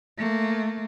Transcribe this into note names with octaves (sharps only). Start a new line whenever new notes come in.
A3 A#3